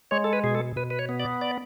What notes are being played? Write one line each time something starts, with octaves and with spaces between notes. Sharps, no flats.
G#3 C#5
A4
B4
B2 G#4
A4
B2 B4
B4
C#5
B3
D5
D5